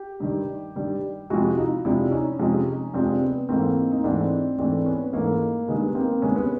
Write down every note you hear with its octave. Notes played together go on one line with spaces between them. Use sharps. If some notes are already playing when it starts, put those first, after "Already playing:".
Already playing: G4
G2 D#3 G3
G2 D#3 G3
F2 C3 F3 G#3 E4 F#4
D#4 F4
F2 C3 F3 G#3 D4 E4
C#4 D#4
F2 C3 F3 G#3
F2 C3 F3 G#3 C4 D4
B3
G#2 E3 A3 A#3 C4
D#4
G#2 E3 A3 C4 D4
G#2 E3 A3 C4 D4
B3 C#4
G#2 E3 A3 A#3
G2 D#3 G#3 B3
A#3 C4
G2 D#3 G#3 B3 C#4
B3 C#4